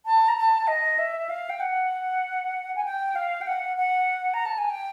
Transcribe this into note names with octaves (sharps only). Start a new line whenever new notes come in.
A5
A#5
A5
D#5
E5
F5
G5
F#5
G#5
G5
F5
G5
F#5
F#5
A#5
A5
G#5
G5